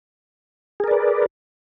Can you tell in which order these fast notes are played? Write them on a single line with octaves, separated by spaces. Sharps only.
G#4 A#4 D5 B4